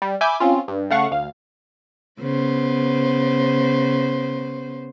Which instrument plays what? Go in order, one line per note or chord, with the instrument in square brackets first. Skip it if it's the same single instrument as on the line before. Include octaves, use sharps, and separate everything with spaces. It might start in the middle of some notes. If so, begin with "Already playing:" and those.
[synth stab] G3
E5 G#5 B5 D6 E6 G6
C4 C#4 F4
G2
C#3 A3 F5 F#5 C#6
D2 F5
[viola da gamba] C#3 B3 C5